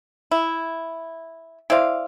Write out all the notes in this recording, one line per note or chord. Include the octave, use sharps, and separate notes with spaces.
E4
E4 C5 D5 F5